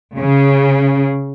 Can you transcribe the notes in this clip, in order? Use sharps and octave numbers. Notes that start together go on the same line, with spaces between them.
C#3